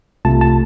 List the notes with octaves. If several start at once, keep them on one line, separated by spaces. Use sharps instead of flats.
C2 C3 A3 F4 A5
A5